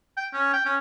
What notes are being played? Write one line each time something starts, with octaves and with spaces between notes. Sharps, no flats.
G5
C#4
G5
C#4